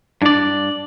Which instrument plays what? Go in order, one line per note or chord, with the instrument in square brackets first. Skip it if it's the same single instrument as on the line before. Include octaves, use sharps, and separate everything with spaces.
[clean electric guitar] G2 D5 [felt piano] D4